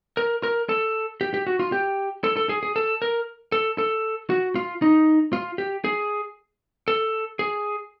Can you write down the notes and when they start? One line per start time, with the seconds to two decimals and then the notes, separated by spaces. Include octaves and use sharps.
0.17 A#4
0.43 A#4
0.69 A4
1.21 G4
1.34 G4
1.47 F#4
1.59 F4
1.72 G4
2.24 A4
2.37 A4
2.49 G#4
2.63 G#4
2.76 A4
3.02 A#4
3.52 A4
3.78 A4
4.30 F#4
4.55 F4
4.82 D#4
5.33 F4
5.58 G4
5.84 G#4
6.88 A4
7.39 G#4